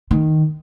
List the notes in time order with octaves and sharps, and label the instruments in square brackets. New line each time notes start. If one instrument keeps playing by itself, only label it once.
[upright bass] D#3